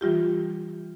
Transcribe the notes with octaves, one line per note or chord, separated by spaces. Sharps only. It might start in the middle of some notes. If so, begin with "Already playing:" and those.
E3 G3 F4 G4